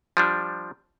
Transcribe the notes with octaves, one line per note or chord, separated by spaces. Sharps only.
F3 G3 D4